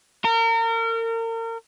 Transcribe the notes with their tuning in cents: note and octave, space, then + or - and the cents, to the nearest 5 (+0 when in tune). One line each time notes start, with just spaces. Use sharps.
A#4 -35